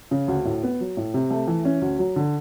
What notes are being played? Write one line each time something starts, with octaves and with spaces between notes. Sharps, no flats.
C#3
D2
A2
B3
F#3
A2
C3
A3
E3
C#4
D2
F#3
D3